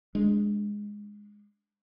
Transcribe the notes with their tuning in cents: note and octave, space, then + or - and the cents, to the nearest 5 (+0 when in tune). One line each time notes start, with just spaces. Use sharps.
G#3 -5 D4 +0